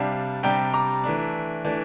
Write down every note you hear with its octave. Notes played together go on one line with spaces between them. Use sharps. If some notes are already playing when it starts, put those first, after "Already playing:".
Already playing: C3 G3 D4 F5 A5
C3 G3 D4 G5 A#5
A#5 D6
E3 A3 D4
E3 A3 D4